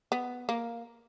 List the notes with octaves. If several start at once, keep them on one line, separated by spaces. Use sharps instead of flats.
B3
A#3